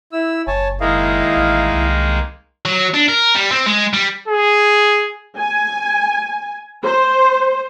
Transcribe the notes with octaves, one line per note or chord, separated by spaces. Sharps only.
E4 E6
F#1 C#5 G#5 A5
D#3 G#3 A#3 E4 D#5 F5
A1
C2
F#3
D4
A#4
G3
C4
G#3
G3
G#4
G#5
C5